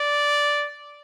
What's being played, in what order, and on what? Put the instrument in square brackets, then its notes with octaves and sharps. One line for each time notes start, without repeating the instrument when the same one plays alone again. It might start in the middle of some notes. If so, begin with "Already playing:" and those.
Already playing: [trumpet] D5